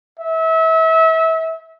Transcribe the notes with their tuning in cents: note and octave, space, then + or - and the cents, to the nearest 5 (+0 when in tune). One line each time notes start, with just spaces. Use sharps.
E5 -30